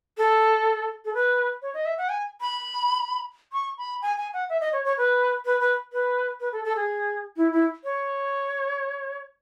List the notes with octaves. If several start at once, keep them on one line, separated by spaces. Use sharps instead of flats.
A4
A4
B4
C#5
D#5
E5
F#5
G#5
B5
C#6
B5
G#5
G#5
F#5
E5
D#5
C#5
C#5
B4
B4
B4
B4
B4
A4
A4
G#4
E4
E4
C#5